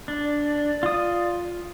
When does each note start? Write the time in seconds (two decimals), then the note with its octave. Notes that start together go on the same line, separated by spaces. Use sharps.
0.08 D4
0.21 D5
0.83 F4 D#6